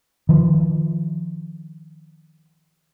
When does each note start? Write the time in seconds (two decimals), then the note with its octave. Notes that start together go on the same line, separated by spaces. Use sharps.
0.29 D#3 F3